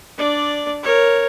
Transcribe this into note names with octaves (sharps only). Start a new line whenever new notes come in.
D4 D5
A#4 C#5